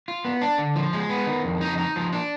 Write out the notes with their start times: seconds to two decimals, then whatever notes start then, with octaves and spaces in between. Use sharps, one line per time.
0.08 F4
0.25 B3
0.42 D4
0.58 D3
0.76 F3
0.93 G#3
1.10 B3
1.27 D#3
1.45 F2
1.61 D#4
1.78 D#4
1.96 F3
2.13 D4